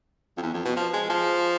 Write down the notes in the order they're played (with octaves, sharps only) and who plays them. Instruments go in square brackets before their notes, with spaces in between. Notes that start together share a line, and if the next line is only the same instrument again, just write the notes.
[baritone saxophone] F2
E2
F2
B2
F3
G#3
F3